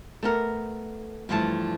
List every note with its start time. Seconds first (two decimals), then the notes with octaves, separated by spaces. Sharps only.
0.23 A3 B3 A#4
1.29 G2 E3 F3 A3 A5